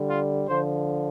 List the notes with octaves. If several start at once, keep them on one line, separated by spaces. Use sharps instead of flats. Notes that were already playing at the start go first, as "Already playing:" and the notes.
Already playing: D3 G3
F4
D3 F3 C5